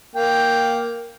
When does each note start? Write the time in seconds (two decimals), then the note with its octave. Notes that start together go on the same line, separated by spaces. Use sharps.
0.15 A#3 G5